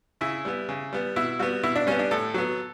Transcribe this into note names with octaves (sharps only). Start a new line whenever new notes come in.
C#3 E4
G3 B3
C#3
G3 B3
B2 E4
G3 B3 F#4
B2 E4
D4
G3 B3 C#4
D4
A2 A4
F#3 B3